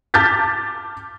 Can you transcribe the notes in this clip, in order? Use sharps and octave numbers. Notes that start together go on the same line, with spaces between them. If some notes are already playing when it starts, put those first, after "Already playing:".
A5 D6 F6 G6 A6 B6